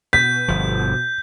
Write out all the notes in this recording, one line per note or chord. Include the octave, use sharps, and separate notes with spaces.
B2 G6 B6
G1 F3